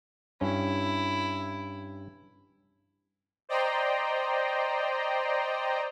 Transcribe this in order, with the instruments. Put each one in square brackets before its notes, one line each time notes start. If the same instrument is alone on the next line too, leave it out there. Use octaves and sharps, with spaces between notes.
[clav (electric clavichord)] G2 C#4 [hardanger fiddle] E4
[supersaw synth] C5 D5 D#5 G5 A#5 C6